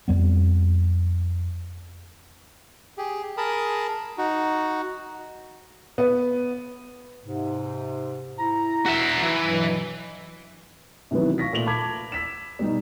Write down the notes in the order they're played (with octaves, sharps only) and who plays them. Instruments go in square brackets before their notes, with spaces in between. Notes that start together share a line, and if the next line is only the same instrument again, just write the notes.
[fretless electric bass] F2 G3 B3
[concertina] G4 G#4
G#4 A#4 A5 B5 D#6
D#4 F#4
[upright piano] B3
[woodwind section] G#2 C3
E4 A#5
[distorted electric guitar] F#4 E5
E3
[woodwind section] G2 B2 F#3
[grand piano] C3 D#3 E3 F#3 B3
F5 C#6 A#6 B6
A#2 A3 F7 F#7
A5 B5 D6 G#6 B6
E6 B6 E7
B2 G3 D#4